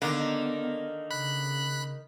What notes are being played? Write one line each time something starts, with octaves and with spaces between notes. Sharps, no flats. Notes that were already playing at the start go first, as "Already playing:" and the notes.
D3 D#3 A#3 B3
C#3 B5 F#6